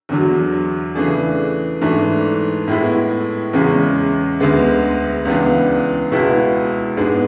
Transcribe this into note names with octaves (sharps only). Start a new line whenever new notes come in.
E2 D3 F#3
C#3 E3 A3 D4 G#4
G#2 E3 A3 D4
A2 G#3 B3 E4
E2 C#3 G#3 C#4
D2 D3 G#3 B3
C#2 C#3 E3 B3 D4
C#2 B2 G#3 B3 E4
G#2 G#3 B3 D4